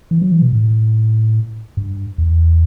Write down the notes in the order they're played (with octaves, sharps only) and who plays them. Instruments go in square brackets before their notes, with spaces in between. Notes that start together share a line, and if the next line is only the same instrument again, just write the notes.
[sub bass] E3
F#3
E3
B2
A2
G2
E2